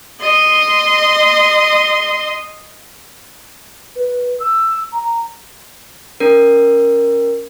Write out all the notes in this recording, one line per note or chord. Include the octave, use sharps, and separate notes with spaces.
D#5 C6
B4
E6
A#5
C#4 A#4